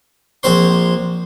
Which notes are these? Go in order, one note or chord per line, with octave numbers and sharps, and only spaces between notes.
A#1 C4 C5 C6